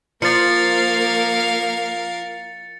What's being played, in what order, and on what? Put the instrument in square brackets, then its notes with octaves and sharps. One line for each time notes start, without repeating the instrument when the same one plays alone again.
[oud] F3 [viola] A#3 [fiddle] A#4 F5 [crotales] A6 C#7